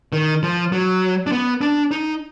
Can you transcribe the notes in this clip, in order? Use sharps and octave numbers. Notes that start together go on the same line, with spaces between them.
D#3
F3
F#3
D4
B3
D4
D#4